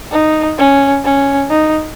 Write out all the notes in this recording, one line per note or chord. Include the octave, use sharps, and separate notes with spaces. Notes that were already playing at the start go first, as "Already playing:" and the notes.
D#4
C#4
C#4
D#4